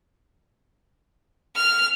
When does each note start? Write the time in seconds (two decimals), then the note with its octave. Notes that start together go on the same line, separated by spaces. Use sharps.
1.56 F6